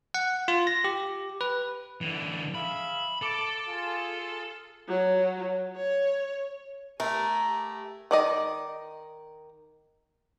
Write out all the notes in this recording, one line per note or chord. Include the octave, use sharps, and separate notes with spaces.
F#5
F4
A#6
G4
B4
D3 E3
G#4 E5 F5 B5
A4 D6
F4 G#4
F#3
C#5
A3 G4 A#4 G#5 A#5
D#3 D5 D#5